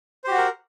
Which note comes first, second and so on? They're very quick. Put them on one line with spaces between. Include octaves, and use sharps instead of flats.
C5 G4 F#4 F#5 A#4